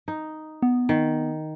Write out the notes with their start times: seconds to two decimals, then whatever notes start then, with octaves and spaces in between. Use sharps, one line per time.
0.08 D#4
0.62 B3
0.89 D#3